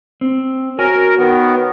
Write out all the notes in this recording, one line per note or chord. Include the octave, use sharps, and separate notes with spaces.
C4
F#4 A#4 C#5 G#5
D#3 B3